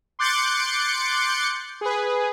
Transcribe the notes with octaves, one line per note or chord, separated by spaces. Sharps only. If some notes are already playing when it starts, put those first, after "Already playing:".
C6 D6 F#6 G6 A6 C#7
G#4 B4